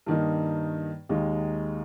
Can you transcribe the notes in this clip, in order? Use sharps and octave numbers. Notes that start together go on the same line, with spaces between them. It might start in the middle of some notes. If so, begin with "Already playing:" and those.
G2 D#3 A#3 D#4
D#2 D#3 G#3 D#4